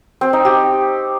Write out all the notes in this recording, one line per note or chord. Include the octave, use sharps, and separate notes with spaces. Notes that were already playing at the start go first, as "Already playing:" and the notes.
C4
D#4
G4